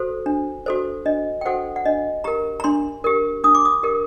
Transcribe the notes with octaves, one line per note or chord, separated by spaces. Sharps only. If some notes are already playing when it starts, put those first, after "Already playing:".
Already playing: F#4 A4 C5
D4
F#4 A4 C5
D4 D#5
G5
F#4 A4 C5 F#5
F#5
D4 D#5
G4 A#4 A#5
A#5
D4 C6
G4 A#4
D4 D#6
D6
D#6
G4 A#4